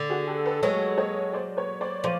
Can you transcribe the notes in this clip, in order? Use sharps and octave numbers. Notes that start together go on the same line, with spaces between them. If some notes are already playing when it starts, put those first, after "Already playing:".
Already playing: D3
F#4 G#4
G4 A4
A4 B4
F#3 G#3 B4 C#5
C#5 D#5
C5 D5
B4 C#5
C5 D5
F3 C5 D5